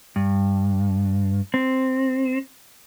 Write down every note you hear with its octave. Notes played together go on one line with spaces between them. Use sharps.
G2
C4